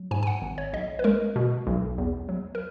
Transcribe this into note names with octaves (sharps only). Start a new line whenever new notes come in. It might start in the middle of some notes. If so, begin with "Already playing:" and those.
Already playing: F#3
G#2 G#5
G#5
F#5
G#1
C#5
B1 D#5
B4
G#3 A#4
B2
B1
E2
F#3
A#4